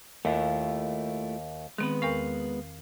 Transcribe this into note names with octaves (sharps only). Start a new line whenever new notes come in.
D#2 A3 E4 F4
D#3 G#3 B3 C4 B4
E2 A#4 F5 C#6